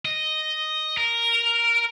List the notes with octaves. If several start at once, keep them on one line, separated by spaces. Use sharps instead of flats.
D#5
A#4